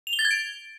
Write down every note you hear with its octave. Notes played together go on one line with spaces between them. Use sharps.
F7
G7
A6
G#6
D7